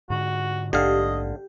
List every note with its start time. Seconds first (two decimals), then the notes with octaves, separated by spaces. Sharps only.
0.10 G#2 D3 F#4
0.73 A#1 G#2 D3 G4 D#5 F5